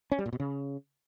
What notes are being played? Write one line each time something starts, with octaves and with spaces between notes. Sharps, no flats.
C#4
G3
A#2
B2
C#3